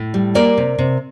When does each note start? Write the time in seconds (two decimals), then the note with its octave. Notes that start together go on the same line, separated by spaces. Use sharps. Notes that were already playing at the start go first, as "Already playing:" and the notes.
Already playing: A2
0.14 G3
0.35 A#3 A#4 D5
0.57 C3
0.79 C3